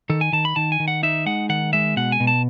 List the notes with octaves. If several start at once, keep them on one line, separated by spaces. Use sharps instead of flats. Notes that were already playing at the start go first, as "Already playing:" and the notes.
D#3 A4
G#5
D#3 A5
B5
D#3 A5
G#5
D#3
F#5
D#4 E5
G#3 F#5
D#3 F#5
G#3 E5
B2 F#5
G#5
B2
A5